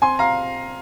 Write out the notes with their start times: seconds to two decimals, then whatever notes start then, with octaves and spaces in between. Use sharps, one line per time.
0.02 C4 G#5 C6
0.19 F5 A#5